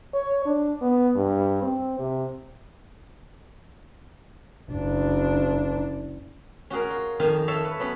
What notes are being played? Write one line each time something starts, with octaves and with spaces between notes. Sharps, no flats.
C#5
D4
B3
G2
C4
C3
F#1 D4
C#4 F#4 G#4 A#4
F4
F2 D#3 F4 D#5 F5 G#5
A4 C#5 E5 F5
B4
F#3 B3 C#4 B5